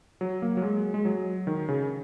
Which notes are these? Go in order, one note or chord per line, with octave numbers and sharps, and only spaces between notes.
F#3
A#3
F#3
G#3
G#3
F#3
D#3
C#3